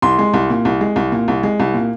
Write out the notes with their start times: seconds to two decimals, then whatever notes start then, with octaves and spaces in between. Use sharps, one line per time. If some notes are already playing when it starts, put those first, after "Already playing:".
0.02 C2 C6
0.19 G#3
0.34 C2
0.50 A#2
0.65 C2
0.81 G#3
0.96 C2
1.12 A#2
1.28 C2
1.43 G#3
1.60 C2
1.74 A#2